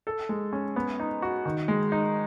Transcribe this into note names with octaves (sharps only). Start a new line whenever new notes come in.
A4
G#3
C#4
B3
D#4
F#4
D#3
G#3
D#4